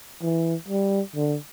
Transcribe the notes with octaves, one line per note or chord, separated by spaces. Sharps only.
E3
G3
D3